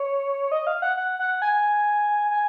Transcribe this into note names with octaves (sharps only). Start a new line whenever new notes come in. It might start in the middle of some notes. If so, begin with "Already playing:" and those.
Already playing: C#5
D#5
F5
F#5
F#5
F#5
G#5
G#5